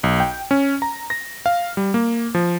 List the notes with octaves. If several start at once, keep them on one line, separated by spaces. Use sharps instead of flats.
B1
G5
C#4
A#5
A#6
F5
G3
A#3
F3